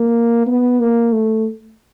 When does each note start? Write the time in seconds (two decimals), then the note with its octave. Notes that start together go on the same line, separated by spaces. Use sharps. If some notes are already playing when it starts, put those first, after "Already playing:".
Already playing: A#3
0.47 B3
0.80 A#3
1.13 A3